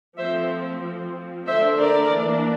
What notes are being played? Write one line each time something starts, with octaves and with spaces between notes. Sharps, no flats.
F3 A3 C4 C5 E5
F3 C4
D3 A3 D4 C5 E5
A#4 D5
E3 A#3 D4